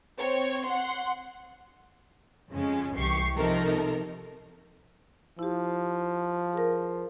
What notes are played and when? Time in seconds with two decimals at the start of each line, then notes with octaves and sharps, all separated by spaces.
0.18 C4 C#5
0.66 F#5 C6
2.51 F2 C#3 G#3 C#4
2.95 C2 E3 G4 C#6 C7
3.36 C3 F3 D#4 A4 A#4
5.39 F3 E4 G4
6.53 G#4 A#4